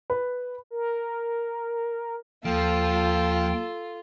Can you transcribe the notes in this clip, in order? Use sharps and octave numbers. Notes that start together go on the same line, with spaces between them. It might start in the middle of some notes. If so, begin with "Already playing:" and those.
B4
A#4
D#2 F3 F4 A4 G5